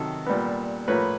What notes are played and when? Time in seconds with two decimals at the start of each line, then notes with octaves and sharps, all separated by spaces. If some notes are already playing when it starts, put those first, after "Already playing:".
Already playing: C3 D#3 F#3 A4
0.26 A#2 G3 B3
0.88 A2 F3 A#3 B4 C#5